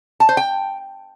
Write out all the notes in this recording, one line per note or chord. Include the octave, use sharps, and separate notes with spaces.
A5
C5
G5